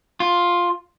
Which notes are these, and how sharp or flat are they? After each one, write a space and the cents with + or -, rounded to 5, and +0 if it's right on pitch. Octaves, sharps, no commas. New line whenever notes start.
F4 +5